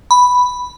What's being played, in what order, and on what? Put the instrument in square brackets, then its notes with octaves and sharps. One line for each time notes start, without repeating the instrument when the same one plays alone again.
[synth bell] B5